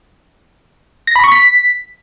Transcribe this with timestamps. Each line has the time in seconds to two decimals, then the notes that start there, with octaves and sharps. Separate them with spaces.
1.07 A#6
1.16 B5
1.24 C#6
1.32 B6